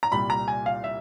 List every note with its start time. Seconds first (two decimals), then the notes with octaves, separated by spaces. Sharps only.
0.03 A#5
0.11 C2 A#2 G3 B5
0.30 A#5
0.48 G#5
0.66 F5
0.84 E5